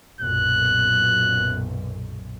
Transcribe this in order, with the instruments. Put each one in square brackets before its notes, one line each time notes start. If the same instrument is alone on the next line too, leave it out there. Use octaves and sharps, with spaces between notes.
[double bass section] B1 F#2 A#2 [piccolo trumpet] F#6